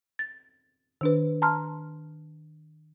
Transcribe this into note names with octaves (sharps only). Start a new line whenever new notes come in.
A6
D#3 D4 B4
A5 A#5 C6 F6